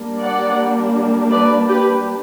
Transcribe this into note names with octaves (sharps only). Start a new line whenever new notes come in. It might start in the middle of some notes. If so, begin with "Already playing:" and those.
Already playing: G3 A#3 D4
D5 F#5
B4 D5
G4 B4